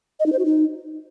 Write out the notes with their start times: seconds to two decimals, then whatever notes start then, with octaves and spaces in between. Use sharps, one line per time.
0.20 D#5
0.26 D#4
0.33 C5
0.39 F#4
0.45 D#4